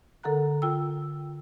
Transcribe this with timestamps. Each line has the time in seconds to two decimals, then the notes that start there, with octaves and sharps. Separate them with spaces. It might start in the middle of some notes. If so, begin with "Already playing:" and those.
0.23 D3 A4 A#4 F#5 A#5 F#6
0.62 F4 G5 E6